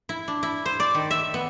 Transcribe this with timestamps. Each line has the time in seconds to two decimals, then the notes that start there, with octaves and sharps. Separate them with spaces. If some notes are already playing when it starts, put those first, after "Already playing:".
0.09 E4
0.28 D4
0.43 E4
0.66 C5
0.80 D5
0.95 D#3
1.11 E5
1.34 B3